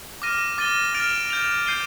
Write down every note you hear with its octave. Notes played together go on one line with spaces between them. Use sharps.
D6 F6 A#6 D#7
D6 A6 D#7 G7
F6 A6 D7 F7
G6 D7 F7
G6 C7 D#7 G7